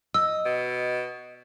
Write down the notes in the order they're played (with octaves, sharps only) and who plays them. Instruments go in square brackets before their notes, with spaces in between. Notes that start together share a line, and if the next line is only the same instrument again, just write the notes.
[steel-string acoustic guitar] D#5 [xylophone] E6
[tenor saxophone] B2